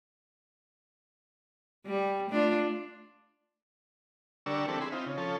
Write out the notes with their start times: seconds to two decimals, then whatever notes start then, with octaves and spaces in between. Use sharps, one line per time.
1.86 G3
2.30 A3 D4 F4
4.46 D3 G3 D4 A#4 C#6 E6
4.68 E3 G3 C4 D4 A4
4.81 G#4 E5 B5 C6
4.92 C4 D#4 F4
5.06 C#3
5.17 F3 C#4 A4